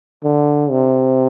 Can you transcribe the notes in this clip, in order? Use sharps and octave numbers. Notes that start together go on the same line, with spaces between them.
D3
C3